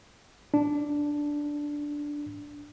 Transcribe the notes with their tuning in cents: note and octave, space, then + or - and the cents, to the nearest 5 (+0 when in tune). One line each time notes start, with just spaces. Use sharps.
D4 -5